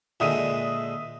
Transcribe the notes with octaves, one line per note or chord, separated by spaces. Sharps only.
A#2 D3 G#3 E5 D#6 D#7